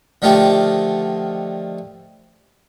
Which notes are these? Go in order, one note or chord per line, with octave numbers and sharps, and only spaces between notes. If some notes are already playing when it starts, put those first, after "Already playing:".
D3 D#3 F3 A3 G4